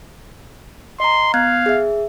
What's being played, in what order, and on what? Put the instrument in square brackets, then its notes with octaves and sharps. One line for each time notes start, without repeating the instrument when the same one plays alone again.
[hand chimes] D#5 A#5 [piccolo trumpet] C6
[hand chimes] B3 F#6 G#6 [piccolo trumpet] F5
[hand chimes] G#4 E5